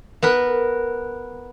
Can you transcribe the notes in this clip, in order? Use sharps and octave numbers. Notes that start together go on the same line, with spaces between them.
B3 A#4 B4